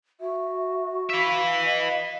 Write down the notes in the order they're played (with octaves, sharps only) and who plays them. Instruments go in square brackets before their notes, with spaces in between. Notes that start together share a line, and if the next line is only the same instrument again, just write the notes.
[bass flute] F#4 [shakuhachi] E5
[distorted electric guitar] B4 E5 [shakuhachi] F5
[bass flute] D#5